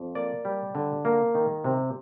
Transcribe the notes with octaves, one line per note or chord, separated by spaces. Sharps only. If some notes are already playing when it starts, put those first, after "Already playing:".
Already playing: F2
A#3 D5
G3
D3
A#3
D#3
C3